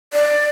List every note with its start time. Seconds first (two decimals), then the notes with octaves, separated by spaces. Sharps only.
0.13 D5